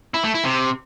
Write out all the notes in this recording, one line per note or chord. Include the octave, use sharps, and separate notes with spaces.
E4
A3
E4
C3